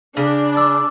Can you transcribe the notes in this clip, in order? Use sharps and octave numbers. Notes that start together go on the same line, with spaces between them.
C#3 D4
D6 E6 A6